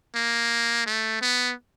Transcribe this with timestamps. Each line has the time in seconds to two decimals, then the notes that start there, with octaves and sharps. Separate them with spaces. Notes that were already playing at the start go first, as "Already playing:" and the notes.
0.15 A#3
0.86 A3
1.22 B3